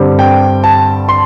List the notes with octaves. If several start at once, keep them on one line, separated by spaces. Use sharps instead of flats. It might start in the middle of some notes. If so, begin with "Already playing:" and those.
Already playing: G2 D3 G3 C4
G5
A5
C6